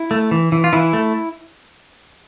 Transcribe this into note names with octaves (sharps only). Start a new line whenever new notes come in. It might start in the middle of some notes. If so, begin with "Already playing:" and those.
Already playing: E4
A3
E3
E3
F4
E3 E4
A3